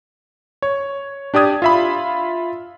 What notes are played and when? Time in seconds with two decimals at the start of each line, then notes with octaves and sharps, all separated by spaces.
0.62 C#5
1.34 D4 G4 D5 D#6 G#6
1.62 F4 E5 B5